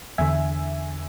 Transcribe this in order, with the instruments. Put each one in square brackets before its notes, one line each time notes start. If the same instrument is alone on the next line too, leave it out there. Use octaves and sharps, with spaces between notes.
[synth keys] E2 D3 E5 G#5